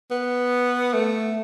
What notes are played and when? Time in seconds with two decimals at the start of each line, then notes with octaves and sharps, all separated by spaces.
0.11 B3
0.94 A3